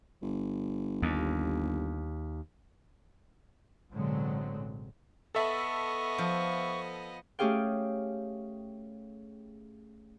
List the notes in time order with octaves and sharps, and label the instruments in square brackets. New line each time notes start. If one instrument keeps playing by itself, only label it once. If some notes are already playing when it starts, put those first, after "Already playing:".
[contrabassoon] G1
[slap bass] D#2
[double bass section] A1 B2 D3 F#3 G#3 C4
[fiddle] B3 D#5 [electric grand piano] A4 E5 A5 [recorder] C#6
[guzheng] F3
[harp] A3 C#4 G4 G#4 F5 G5